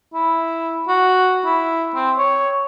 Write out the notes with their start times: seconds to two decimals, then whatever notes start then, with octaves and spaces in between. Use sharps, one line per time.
0.14 E4
0.88 F#4
1.45 E4
1.95 C4
2.18 C#5